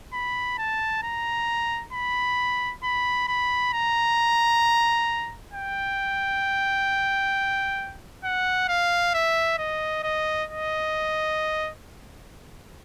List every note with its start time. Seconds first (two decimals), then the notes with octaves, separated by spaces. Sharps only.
0.13 B5
0.58 A5
1.03 A#5
1.93 B5
2.84 B5
3.29 B5
3.73 A#5
5.54 G5
8.24 F#5
8.69 F5
9.14 E5
9.59 D#5
10.04 D#5
10.49 D#5